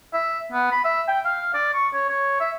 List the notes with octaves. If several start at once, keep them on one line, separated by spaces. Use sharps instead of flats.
E5
B3
B5
E5
G5
F5
D5
C#6
C#5
C#5
E5